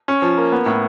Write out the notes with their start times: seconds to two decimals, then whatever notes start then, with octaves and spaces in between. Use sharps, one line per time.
0.08 C#4
0.22 F3
0.38 A#3
0.52 B3
0.66 A2